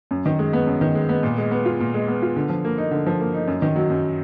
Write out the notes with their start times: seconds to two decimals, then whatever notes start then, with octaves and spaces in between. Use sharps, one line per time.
0.11 F#2
0.26 D#3
0.39 G#3
0.53 B3
0.67 F#2
0.81 D#3
0.95 G#3
1.09 B3
1.23 A#2
1.38 G#3
1.51 B3
1.65 F4
1.80 A#2
1.94 G#3
2.08 B3
2.22 F4
2.36 D3
2.49 F3
2.64 A#3
2.78 D#4
2.91 D3
3.07 F3
3.20 A#3
3.34 D#4
3.48 F#2
3.62 D#3
3.76 F#3
3.90 F#2